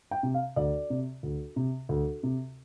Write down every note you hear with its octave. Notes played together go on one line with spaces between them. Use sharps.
G5
C3
F5
D2 D5
C3
D2
C3
D2
C3